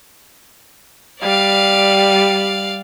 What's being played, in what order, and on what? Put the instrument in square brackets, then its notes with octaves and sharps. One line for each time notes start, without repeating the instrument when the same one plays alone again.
[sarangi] G3 [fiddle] D5 F5